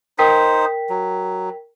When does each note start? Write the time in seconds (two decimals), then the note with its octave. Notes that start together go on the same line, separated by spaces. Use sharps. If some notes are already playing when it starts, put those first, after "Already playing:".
0.19 D#4 A#4 C5 G5 B6
0.90 F#3